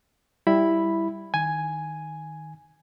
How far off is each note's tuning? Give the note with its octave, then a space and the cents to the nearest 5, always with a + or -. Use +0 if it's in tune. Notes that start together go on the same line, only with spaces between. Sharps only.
G3 +0 E4 +0 B5 +0
D#3 +0 G#5 +0